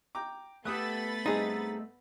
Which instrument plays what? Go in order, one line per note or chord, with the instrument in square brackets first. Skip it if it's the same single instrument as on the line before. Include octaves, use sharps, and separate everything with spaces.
[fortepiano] G5 A#5 D6
[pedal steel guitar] A3 A4 [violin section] B3 B5 A6 [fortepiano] G4 D#6 F#6
[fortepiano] G2 C4 D#5 [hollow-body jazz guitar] D#4 G#4